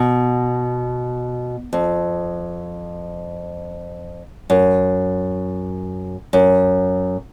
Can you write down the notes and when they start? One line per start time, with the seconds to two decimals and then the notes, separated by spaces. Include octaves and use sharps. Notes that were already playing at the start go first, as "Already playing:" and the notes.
Already playing: B2
1.73 F2
4.50 F#2
6.33 F#2